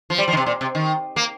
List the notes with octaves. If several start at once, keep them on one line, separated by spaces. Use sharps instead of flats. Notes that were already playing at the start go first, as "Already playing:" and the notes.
F3
G3
F3
D#3
C3
A#2
C3
D#3
A#3